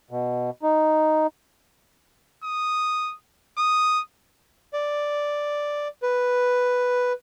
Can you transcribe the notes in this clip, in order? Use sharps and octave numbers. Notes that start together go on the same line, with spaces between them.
B2
D#4
D#6
D#6
D5
B4